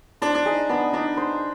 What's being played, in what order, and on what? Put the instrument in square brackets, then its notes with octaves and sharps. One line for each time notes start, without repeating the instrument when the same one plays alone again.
[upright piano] D4 [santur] C5
[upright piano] D4
[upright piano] D#4 [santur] G#4
[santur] B3 [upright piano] D4
[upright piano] D4 [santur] D#4
[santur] C5